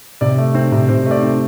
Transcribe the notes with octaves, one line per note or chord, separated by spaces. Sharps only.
C3 D5
A3
C4
C3
C3 C5
A3
D5
C4